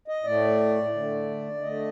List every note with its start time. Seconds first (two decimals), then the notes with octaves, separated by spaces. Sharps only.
0.08 D#5
0.24 A2 A3 D5
0.93 D3 A3
1.61 D3 A3 D#5